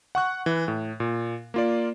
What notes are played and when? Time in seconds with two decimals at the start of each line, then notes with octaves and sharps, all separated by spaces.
0.15 F#5 C#6 F#6
0.46 E3
0.68 A2
1.00 A#2
1.54 A#3 F4 D5